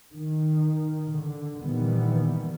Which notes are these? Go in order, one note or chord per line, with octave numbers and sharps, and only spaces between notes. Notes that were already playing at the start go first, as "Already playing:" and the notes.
D#3
D3
A#2 D#3 E3 G3 B3